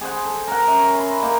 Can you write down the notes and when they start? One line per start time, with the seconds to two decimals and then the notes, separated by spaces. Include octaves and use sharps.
0.01 G#4 C5 F#5
0.25 A4
0.47 A#4 F#5
0.67 C#4 E5
0.95 B5 C6
1.22 A#3 D#4